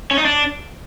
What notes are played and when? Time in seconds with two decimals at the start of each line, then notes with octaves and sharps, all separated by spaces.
0.11 C#4
0.18 D#4
0.25 D4